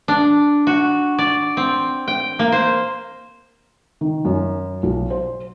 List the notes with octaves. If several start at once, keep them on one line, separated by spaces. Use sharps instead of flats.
D4
F#4
D5
C4
G5
A#3
C5
D#3
F#2
B1
C5